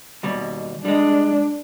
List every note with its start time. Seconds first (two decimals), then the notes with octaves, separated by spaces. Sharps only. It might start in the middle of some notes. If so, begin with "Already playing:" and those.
0.23 D#2 B2 G3
0.85 G3 G#3 D4